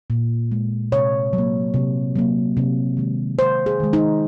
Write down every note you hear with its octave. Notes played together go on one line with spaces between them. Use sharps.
A#2
G#3
C3 C#5
F#3
A#3
C3
F#3 A#3
C3
D#3 G#3
C3 C5
G#4
D#3 G#3
D#4